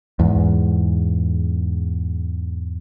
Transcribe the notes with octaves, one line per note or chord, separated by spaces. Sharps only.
E2 G#2